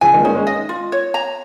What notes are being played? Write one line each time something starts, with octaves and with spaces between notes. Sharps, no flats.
C#3 F3 G#5
D#3 G#3
A#3
G#3 C#4 D#4
G#3 C#4
D#5
F4
C#5
A#5